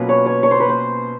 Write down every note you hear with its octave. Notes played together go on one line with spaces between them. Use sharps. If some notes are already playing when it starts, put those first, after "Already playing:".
Already playing: B2 F#3 A#3 C#4 F4 B4
C#5
C#5
C#5
C5
B4
C5